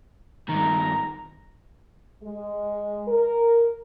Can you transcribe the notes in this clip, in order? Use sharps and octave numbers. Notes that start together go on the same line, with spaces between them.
G2 D#3 A#5
G#3
A#4